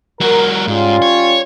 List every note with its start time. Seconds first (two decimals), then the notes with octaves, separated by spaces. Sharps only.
0.21 G3 F#4 A#4
0.68 G#2 G3 C#4 F4
1.02 C#5